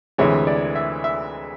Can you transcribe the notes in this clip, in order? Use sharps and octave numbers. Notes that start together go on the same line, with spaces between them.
D2 C3 E3 G#3 C#5
D5
E5
E5